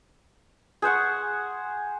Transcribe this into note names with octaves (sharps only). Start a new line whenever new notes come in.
G#4 C5 F#5 C#6